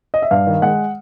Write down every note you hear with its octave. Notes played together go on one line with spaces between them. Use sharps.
D#5
E5
G2 F5
D#3
G#3 F#5